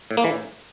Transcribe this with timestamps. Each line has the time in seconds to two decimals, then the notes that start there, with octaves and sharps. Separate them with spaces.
0.11 A2
0.17 A#3
0.24 E3
0.31 A2